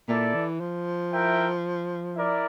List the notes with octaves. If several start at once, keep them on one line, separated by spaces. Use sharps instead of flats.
A#2 E4 A4 D5
E3
F3
E4 A#4 E5 G5
E4 A#4 D5